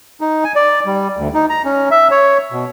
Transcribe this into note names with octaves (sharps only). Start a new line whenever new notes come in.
D#4
G#5
D5
G3
D2
D#4
A#5
C#4
E5
C#5
B2